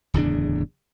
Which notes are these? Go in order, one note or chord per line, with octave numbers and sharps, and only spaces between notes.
D1 E2 C#3 D4